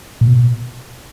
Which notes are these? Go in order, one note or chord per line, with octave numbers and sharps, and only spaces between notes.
A#2
B2